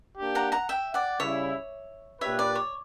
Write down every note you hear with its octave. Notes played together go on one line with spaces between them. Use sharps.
A#3 D4 G4
F#5 A#5
F#5 A#5
E5 G5
D5 F#5
C#3 G3 C#4 E4 C#5 E5
A#2 A#3 D4 G4 B4 C#5 E5
D5
C#5